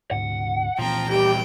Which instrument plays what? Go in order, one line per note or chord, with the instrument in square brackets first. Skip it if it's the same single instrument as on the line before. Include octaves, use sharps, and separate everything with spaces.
[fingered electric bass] D2 G#2 [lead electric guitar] F#5
[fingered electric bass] A#2 E3 C4 [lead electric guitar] F3 [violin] G5 A#5
[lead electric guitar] F2 G3 [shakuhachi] G4 [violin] G5